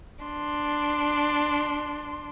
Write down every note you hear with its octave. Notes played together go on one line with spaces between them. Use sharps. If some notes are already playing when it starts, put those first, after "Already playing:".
D4 C6